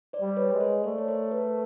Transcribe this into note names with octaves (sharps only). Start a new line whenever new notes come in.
C5 D5
G3
B4 C#5
G#3
A#4 C5
A3 C5 D5
C#5
A#4 C5
A4 B4